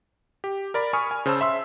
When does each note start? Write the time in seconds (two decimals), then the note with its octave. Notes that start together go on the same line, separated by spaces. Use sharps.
0.44 G4
0.74 A#4 D5 B5
0.93 G#5 B5 C#6 D#6 F6
1.11 G#5
1.26 C#3 C5 A5 E6
1.41 E5 C6 E6